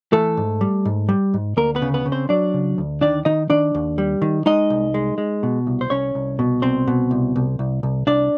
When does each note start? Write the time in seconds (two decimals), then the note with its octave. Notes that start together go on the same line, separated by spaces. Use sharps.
0.13 E3 A3 A4
0.37 G#2
0.61 G3
0.85 G#2
1.09 G3
1.34 G#2
1.57 D2 A#3 A#4
1.75 B3 B4
1.82 C#3
1.94 B3 B4
2.06 C#3
2.12 C4 C5
2.29 F#3 D4 D5
2.54 C#3
2.78 D2
3.01 D#3 D4 D5
3.25 D#3 D#4 D#5
3.50 D#3 D4 D5
3.75 D#2
3.98 G3
4.22 D#3
4.46 G#3 D#4 D#5
4.70 C2
4.94 G#3
5.18 G#3
5.43 B2
5.67 C2
5.81 C5
5.90 C2 C#4 C#5
6.15 C2
6.39 B2
6.62 C2 C4 C5
6.87 B2
7.11 C2
7.36 C2
7.59 C2
7.83 C2
8.07 C2 D4 D5